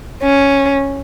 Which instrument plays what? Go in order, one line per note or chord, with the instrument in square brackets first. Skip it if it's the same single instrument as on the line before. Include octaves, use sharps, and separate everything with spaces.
[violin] C#4